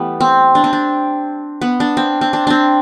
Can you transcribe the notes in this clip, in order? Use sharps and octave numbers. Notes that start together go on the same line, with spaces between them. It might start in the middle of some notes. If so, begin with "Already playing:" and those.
Already playing: E3 G3 A3 B3
C4
D4
C4
D4
B3
D4
C4
C4
D4
C4 D4